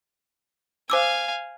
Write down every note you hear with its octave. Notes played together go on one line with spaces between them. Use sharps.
C5 F5 G#5 D6 E6